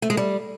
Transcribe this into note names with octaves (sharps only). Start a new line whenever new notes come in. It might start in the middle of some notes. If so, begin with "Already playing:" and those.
A3
G#3
G3